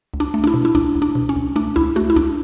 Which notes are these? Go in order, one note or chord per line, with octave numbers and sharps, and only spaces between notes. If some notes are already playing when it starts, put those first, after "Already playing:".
C#2
D4
A3
D4
E4
B2
E4
C#2 D4
C#2
D4
B2
C#4
C#2
A3 D4
C#2 E4
A3 F#4
E4
C#2 D4